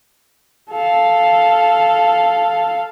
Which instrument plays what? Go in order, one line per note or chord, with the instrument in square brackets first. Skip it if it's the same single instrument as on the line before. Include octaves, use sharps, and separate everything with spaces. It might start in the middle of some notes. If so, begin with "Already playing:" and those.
[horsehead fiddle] A4 F5